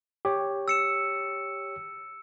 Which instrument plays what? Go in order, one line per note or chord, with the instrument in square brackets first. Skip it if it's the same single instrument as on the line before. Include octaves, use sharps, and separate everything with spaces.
[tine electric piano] G4 C#5
[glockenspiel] E6 C#7 E7